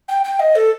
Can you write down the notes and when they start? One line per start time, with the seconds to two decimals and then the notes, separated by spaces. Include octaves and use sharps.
0.08 G5
0.24 G5
0.40 D#5
0.55 A4